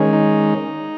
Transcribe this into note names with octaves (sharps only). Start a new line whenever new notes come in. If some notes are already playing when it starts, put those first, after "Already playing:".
Already playing: D#3 G#3 C#4
D#4